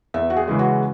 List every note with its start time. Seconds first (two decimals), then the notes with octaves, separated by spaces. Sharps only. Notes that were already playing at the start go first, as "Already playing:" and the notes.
0.14 E2 E5
0.30 F#4
0.36 G#4
0.48 C#3 E3 G#3
0.59 F#4